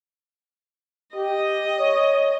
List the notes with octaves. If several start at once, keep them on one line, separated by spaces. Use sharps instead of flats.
G4 D#5
C#5